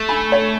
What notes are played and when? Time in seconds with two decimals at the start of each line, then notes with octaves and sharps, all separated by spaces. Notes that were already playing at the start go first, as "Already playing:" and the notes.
Already playing: A3
0.09 G#5 B5
0.32 A4 C#5